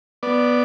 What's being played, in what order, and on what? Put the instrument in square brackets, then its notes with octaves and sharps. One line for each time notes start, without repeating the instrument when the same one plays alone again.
[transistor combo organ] B3 D5